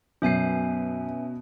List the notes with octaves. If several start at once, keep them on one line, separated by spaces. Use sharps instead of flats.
F#2 B2 C#4 E5 G#5 C7